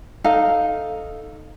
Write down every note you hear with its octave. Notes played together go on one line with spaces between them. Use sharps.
D#4 A4 F5 A#5